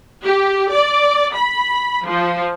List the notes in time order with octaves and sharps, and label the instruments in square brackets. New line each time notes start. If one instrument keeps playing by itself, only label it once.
[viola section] G4
D5
B5
F3